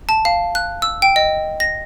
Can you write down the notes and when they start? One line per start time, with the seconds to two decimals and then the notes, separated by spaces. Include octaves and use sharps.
0.09 A5
0.25 F5
0.55 F#6
0.82 E6
1.02 G5
1.16 D#5
1.60 A#6